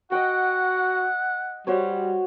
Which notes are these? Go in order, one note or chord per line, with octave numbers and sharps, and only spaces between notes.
F#4 D#5 F#5 G5
G3 F#4 C5 C#5